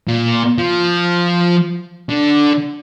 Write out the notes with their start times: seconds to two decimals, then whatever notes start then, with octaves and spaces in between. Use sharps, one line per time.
0.08 A#2
0.58 F3
2.10 D3